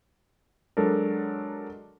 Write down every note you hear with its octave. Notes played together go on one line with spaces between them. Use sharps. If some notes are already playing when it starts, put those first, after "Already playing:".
F#3 G#3 D4 A4 A#4